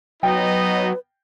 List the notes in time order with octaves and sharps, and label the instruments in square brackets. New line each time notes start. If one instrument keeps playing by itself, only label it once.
[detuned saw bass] F#3 [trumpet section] B3 D#4 D#5 [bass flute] B4 [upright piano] G5